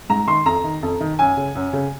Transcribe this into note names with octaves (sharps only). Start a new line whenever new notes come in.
G#2 A#5
D#3 C6
F2 A#5
D#3
F2
D#3
F#2 G#5
C#3
F#2
C#3